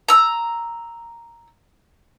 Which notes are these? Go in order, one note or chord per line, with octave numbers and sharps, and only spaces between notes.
A#5 E6